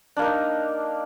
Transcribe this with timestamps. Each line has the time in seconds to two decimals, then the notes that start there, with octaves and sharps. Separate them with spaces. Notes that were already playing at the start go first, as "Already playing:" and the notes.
0.17 D4
0.19 A#3
0.22 A#4
0.24 D#4